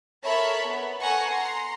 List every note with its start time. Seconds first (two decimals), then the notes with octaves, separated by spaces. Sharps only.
0.24 A4 A#4 C#5 E5 A5 B5
0.66 B3
1.00 A4 F#5 G#5 A#5 C#6
1.29 A#5 C6